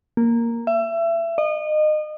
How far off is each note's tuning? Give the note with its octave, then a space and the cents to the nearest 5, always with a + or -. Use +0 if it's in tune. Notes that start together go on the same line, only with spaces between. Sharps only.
A#3 -5
E5 +25
D#5 -30